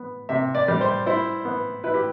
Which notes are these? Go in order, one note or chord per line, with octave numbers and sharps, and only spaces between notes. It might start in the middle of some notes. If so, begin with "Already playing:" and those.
Already playing: B3
C3 E5
D5
G3
C5
E4 C5
B3
E4 B4
G4